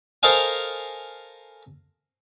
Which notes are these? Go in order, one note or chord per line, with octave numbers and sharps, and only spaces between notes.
A4 A#4 C5 D#5 F5 G#5